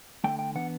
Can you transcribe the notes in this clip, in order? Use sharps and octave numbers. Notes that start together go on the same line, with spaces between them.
D3 A3 D4 G5
G5
E3 B3 D4 F#5